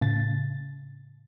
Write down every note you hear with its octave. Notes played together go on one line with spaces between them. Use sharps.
A2 C#3 A6